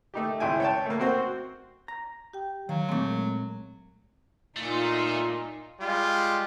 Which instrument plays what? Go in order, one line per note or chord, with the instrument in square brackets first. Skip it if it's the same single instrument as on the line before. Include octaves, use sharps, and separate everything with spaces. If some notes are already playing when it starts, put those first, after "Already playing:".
[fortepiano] A3 D#4 G4
G#1 C#2 E4 G5 G#5
C#5 G5 A5
A3 A#3
C4 F#4 C5
[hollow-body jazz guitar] A#5
[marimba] G4 G5
[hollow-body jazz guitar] D#3 [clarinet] F#3 [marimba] F5
[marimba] A#2 C4 [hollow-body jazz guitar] G#3 A3
[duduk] A#2 [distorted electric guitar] A3 [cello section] D#4 F4
[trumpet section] G3 G#3 F4